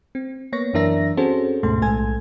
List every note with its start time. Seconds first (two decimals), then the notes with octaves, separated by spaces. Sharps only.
0.15 C4
0.52 A#3 B3 C#5 C#6 A#6
0.74 F#2 E3 D4 A#4 E5 A#6
1.17 C4 C#4 F#4 G#4 A4 C5
1.63 D2 G#2 B2 A3 C6
1.82 B1 A2 G#3 A4 G#5 G#6